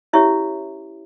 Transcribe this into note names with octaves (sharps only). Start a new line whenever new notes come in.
C#4 E4 G4 C#5 E5